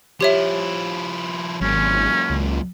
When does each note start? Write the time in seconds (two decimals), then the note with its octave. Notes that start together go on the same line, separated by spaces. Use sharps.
0.21 F3 E4 G4 C#5 E5
1.61 G#1 F#2 A#2 C#4
2.30 C#2